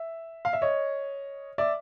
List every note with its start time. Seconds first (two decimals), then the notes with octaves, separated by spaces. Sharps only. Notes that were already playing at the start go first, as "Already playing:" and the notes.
Already playing: E5
0.45 F5
0.53 E5
0.62 C#5 D#5
1.58 D5 E5